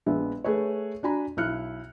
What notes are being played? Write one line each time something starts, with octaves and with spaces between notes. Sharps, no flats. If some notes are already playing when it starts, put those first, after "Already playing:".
A#1 G#3 B3 E5
A3 G#4 B4 C#5
D4 F#4 G#5 A#5 B5
B1 E4 F6 F#6 C#7